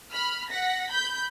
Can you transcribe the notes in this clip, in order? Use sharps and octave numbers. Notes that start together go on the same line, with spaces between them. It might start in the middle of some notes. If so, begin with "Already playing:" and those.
B5 F6
F#5 A#6 B6
B5 G6